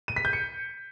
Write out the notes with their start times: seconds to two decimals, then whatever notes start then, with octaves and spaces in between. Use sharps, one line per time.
0.08 D#7
0.16 B6
0.25 G6
0.33 C#7